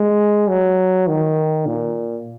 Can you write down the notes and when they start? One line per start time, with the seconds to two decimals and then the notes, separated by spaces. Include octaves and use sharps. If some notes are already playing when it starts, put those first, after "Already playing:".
Already playing: G#3
0.49 F#3
1.07 D#3
1.66 A#2